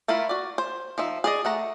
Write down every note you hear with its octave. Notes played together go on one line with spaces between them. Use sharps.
A3 E4 F4 A#4 B5
F#4 D5
C5
F3 D#4 E5
G#4 D5 D#5
A3 F#5 A#5